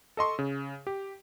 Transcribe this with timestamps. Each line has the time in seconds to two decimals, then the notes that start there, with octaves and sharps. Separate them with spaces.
0.17 A4 D#5 C6 C#6
0.39 C#3
0.87 G4